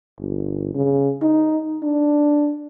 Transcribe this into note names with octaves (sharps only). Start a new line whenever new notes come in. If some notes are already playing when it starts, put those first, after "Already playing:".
G1
C#3
D#4
D4